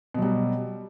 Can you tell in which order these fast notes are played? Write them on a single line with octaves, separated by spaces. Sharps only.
B2 F#3 G3